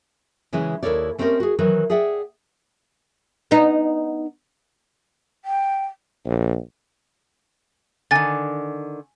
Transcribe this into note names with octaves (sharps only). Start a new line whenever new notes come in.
C#3 E3 G#3 C#4 E4
D#2 E4 A4 A#4 C#5 D5
A3 C4 C#4 G4 A#4 D#5
F#4 G#4
D#3 E3 F#3
G#4 D5 E5 F#5 G5
B3 D#4
G5
A#1
D3 D#3 G#5 A6